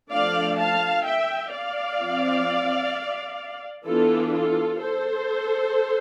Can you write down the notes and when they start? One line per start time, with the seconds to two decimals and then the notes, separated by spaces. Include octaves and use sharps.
0.12 F3 A3 D4 D5 F5
0.59 F5 A5
1.05 E5 G5
1.52 D5 F5
2.00 F3 C4
3.87 E3 B3 D4 F4 A4
4.34 F4 A4
4.81 A4 C5